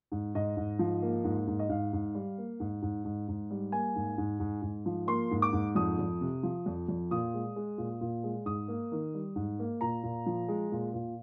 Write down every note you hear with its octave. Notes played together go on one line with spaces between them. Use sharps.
G#2
G#2 D#5
G#2
F3
A#3
G#2
G#2
D#5
G#2 F5
G#2
G3
A#3
G#2
G#2
G#2
G#2
G3
A#3 G#5
G#2
G#2
G#2
G#2
F3
A#3 C6
G#2
D6
G#2
F2 D#6
F2
C3
F3
F2
F2
A#2 D#6
G#3
G#3
A#2
A#2
G#3
G#2 D#6
A#3
D#3
G3
G#2
A#3
A#2 A#5
A#2
F3
G#3
A#2
A#2